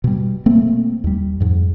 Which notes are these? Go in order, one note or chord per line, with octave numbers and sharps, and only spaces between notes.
B2 G3
A3 A#3 C4
D#2 G3
F2 G#2